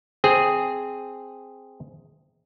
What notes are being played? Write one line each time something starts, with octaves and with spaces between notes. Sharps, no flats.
C4 G#4